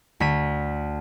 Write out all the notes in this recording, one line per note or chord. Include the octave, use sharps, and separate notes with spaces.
D2 B6 D#7